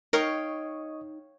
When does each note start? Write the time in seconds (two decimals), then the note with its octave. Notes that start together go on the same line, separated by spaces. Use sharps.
0.13 D#4 A#4 C#5 D#5 F5 G5 C#6 D#6